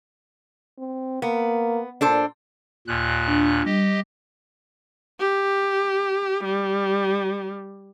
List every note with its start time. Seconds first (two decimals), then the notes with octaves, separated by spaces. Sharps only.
0.78 C4
1.22 A#3 B3
2.01 A#2 D4 A4 C5
2.87 D#2 A#2 F#6
3.28 D4
3.66 G3 G4 D#5
5.20 G4
6.44 G3